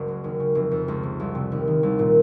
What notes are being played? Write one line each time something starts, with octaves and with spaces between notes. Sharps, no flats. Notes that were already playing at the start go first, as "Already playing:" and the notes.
Already playing: F#1 C#2 C#3 F#3
F#2
D#2
C#3
F1
F2
C#2
C3
C2
C3
D#2
D#3
C2
A#2